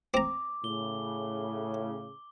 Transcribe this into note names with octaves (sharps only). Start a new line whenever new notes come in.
C4 A#5 D6
A2 C#3 G7